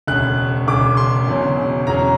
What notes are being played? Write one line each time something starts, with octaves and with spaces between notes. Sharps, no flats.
E1 D2 C#3 F#6
E1 D2 C#3 D6
C6
E1 E2 C#3 F#3
E1 E2 C#3 F#3 A#5